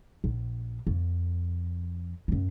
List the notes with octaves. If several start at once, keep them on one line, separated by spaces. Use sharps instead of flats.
A#1
F2
F#2 C#4